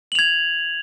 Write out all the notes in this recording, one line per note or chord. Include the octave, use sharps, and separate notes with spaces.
G#6 F7 F#7